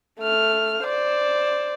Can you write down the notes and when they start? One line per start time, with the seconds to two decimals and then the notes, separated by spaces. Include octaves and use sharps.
0.21 A3 F6
0.84 C5 D5